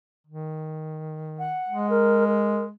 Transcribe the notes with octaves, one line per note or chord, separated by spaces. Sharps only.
D#3
F#5
G#3
A#4
A#4